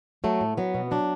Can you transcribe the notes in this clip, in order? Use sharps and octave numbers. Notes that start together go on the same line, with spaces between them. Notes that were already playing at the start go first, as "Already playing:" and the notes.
F#3 A3
A2
F#3 B3
B2
F#3 D4